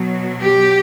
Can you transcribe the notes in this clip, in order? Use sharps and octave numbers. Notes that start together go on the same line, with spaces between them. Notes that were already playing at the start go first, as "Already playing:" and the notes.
Already playing: B2 F#3
G4